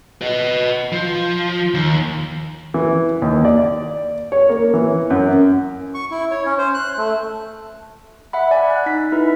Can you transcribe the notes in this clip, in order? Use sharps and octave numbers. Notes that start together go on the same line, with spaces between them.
B4 D#5
F3
D#2
E3
D#2
D5
C#5
A#3
E3
F#2
C#6
E4
C#5
C#4
C5
F#6
A3
E5 F#5 B5
D5 F#5 G#5
F#6
D#4 B6
D#4 E4 B4